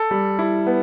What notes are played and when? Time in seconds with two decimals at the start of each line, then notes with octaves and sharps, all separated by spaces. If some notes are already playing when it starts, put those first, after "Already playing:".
Already playing: A4
0.11 G3
0.39 E4
0.67 B3